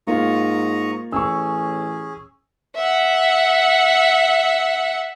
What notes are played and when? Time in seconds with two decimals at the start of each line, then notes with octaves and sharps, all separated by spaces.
0.07 G#2 A#3 F4 A#5 C#6 D#6
1.12 A1 C#4 G#4 C#6 E6
2.76 E5 F#5